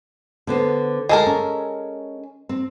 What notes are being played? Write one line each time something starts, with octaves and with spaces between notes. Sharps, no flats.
D3 B3 C5
D2 G#3 A4 A#4
C#4
C4